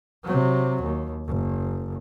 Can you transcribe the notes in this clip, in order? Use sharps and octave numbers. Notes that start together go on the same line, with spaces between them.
C3 F#3
D#2
F#1